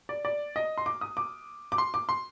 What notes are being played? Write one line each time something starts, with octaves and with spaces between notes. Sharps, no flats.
D5
D5
D#5
C6
D6
D#6
D6
D6
C6
D6
C6